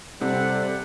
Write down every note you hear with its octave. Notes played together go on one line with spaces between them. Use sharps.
C3 G3 A4 C5 F#5